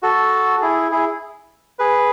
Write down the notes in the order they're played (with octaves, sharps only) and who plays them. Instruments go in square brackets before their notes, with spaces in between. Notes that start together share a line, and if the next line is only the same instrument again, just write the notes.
[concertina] F#4 A4
E4 G#4
E4 G#4
G#4 B4